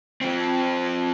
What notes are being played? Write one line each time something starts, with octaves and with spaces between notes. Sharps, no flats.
F3 C4